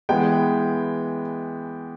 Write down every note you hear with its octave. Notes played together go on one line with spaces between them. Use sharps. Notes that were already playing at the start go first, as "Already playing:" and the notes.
E3 G#3 B3 G5